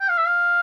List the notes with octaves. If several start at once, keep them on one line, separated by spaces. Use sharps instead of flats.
G5
F5
E5
F5